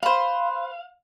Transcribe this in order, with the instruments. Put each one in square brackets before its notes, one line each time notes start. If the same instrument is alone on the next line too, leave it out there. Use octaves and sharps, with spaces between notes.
[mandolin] B4 C5 [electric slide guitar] F5